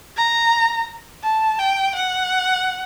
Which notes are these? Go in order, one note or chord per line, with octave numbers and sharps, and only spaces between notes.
A#5
A5
G5
F#5